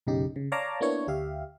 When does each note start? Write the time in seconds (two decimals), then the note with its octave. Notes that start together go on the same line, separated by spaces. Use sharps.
0.07 B1 F#2 C#3 D#4 G4
0.36 C#3
0.52 C#5 D5 F5 A5 A#5 D6
0.81 A#3 B3 D4 E4 C#5
1.08 D2 G4 E5 F5